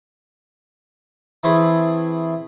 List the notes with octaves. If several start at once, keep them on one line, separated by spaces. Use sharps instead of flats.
E3 A3 C4 E4 G#4